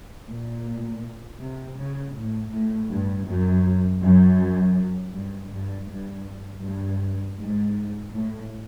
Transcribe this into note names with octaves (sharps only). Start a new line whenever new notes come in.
A#2
C3
C#3
A2
A2
G2
F#2
F#2
G2
G2
G2
G2
G#2
A2